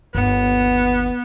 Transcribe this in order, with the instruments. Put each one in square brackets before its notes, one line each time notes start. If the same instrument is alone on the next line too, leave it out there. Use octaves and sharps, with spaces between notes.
[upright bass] G1 D#2 [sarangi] B3